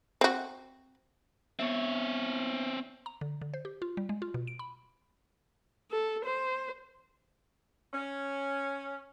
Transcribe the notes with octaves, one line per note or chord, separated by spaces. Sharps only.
C4 F#4
B3 C4 C#5 E5
A#5
D3
D3
C5
G4
F4
G3
G#3
F4
B2
D7
B5
A4
C5
C#4